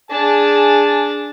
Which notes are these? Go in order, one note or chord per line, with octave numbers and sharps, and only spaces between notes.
D4 G#4 G#5 A5